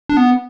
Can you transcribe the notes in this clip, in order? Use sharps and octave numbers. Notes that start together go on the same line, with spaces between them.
D4
B3